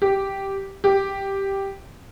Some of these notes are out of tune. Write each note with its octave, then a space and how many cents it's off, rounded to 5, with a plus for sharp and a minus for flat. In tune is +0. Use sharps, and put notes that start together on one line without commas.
G4 -5
G4 +0